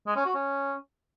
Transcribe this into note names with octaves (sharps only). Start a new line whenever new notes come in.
G#3
C#4
F#4
C#4